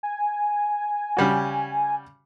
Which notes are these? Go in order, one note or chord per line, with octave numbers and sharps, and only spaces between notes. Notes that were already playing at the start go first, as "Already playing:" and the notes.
G#5
C#3 G3 F#4